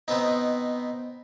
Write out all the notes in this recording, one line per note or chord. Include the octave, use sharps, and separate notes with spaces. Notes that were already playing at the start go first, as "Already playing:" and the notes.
B2 B3 C4 D#4